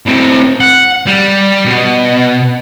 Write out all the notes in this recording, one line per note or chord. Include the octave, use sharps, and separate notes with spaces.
A2 C4
F#5
G3
B2